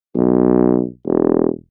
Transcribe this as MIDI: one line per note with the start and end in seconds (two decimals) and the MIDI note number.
0.16 0.84 35
1.07 1.48 28